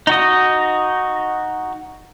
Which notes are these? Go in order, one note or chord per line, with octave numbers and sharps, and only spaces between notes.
D#4 F#4 D#5